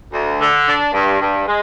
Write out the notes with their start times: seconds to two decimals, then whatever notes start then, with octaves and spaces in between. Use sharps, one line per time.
0.12 D2
0.40 D3
0.67 D4
0.94 G2
1.20 G2
1.47 G#3